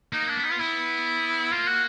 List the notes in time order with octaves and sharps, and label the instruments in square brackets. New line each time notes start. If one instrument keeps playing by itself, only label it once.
[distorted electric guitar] A#3 [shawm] D#4
[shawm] D4
[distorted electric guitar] B3
[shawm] D#4
F4
[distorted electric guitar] B3 [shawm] E4
[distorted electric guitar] A#3 [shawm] F4
[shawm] F#4